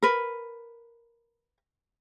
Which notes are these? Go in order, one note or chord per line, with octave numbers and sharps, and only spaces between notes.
A#4 B4